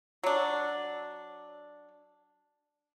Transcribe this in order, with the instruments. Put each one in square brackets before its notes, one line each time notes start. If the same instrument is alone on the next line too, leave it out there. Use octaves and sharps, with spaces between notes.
[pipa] F#3 D4